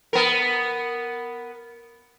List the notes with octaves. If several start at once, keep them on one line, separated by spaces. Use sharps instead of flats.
B3 A#4